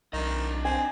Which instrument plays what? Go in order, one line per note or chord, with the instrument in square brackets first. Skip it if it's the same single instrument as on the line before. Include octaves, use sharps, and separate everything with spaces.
[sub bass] B1 [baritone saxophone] D#3 [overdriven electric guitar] D4 D#5
[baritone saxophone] C4 [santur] G#5